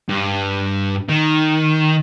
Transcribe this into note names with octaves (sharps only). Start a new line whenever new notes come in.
G2
D#3